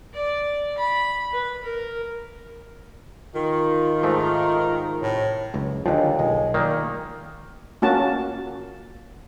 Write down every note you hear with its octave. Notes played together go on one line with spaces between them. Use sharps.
D5
B5
B4
A#4
D#3 F4
G#2 F3 A3 A#4
A2 C3
F#1 C#2
D#2 D3 F3 G#3
B1 G#3
A#2 D#3 A#3
A#3 C#4 F#4 A5